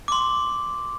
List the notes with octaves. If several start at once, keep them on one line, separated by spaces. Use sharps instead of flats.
D6
C6